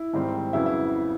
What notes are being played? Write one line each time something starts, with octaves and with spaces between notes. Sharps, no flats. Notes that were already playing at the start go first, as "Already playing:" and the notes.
Already playing: E4
G#2 D#3 G3 C4
F2 C#3 F#3 B3 E4
E4